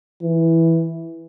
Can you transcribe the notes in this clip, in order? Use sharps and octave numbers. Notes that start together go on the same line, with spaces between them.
E3